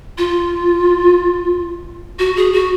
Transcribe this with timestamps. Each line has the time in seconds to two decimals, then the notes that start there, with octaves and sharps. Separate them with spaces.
0.18 F4
2.19 F#4
2.37 G#4
2.53 F#4